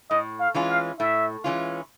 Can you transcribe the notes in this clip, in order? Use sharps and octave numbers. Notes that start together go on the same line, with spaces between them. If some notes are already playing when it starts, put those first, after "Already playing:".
A2 D#5
F5
E3 G#3 C#4 F4
F5
A2 E5
E3 G#3 C#4 F4